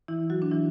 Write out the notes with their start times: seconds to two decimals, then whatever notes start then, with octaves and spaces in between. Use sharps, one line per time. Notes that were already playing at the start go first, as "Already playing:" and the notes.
0.08 E3 E4
0.30 F#3 F#4
0.42 D4
0.51 E3 E4